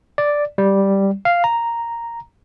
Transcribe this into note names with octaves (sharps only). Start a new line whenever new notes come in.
D5
G3
F5
A#5